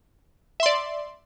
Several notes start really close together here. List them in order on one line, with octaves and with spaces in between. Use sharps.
E5 C6 D5